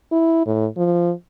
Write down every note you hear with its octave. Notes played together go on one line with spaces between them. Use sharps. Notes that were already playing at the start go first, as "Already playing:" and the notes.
E4
A2
F3